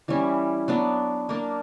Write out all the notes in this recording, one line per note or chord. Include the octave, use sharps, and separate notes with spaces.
E3 G3 C#4 E4
F#3 B3 D4
A#3 D4 A#4